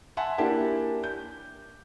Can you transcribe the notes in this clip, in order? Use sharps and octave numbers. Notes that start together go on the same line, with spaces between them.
E5 F#5 G#5 A5 C6
A#3 D4 E4 G4 G#5 A5
G6